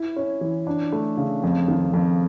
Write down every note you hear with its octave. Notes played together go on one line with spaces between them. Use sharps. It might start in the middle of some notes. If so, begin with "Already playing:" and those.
Already playing: E4
C#4
E3
D4
A3
C#3
F2
D#3
F2